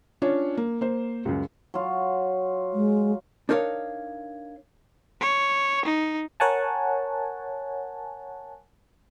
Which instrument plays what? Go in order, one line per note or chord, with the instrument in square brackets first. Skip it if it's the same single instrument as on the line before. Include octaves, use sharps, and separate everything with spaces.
[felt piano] C#4 D4 F4 C#5
A#3
A#3 C5
C#2 F#2
[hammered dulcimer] F#3 F4
[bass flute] G#3
[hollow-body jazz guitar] D4 D#4 A#4 C#5 F5
[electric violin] C#5
D#4
[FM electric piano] A#4 C#5 F#5 G#5 A5